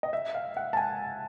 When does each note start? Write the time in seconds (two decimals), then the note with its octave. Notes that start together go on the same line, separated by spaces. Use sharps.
0.03 D#5
0.13 E5
0.35 F5
0.57 F#5
0.73 A5
0.77 G#5